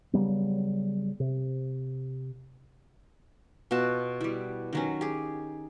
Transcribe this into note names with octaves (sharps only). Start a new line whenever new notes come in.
C#3 F#3 G3 B3
C3
B2 F4 F#4 A5
G3 E4
D#3 F#3 C#4
G4 G#4